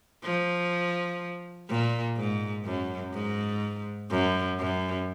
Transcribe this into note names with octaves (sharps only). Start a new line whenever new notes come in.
F3
A#2
G#2
F#2
G#2
F#2
F#2